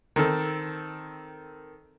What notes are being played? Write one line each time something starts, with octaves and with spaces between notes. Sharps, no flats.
D#3 C4 A4